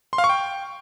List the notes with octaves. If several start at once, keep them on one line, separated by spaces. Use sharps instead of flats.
C6
F5
C#6
G5